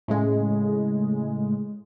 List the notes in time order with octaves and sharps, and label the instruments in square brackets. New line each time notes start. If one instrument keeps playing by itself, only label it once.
[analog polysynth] A2 C#3 G#3